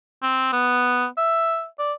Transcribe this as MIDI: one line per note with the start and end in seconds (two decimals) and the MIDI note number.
0.22 0.50 60
0.53 1.07 59
1.18 1.66 76
1.79 1.93 74